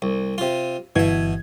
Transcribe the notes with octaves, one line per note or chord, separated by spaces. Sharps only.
C2
C3 F4
G1 B2 E3 E5 G#6